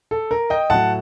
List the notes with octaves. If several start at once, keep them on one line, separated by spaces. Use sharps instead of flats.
A4
A#4
D#5 G5
A2 F#3 F#5 A5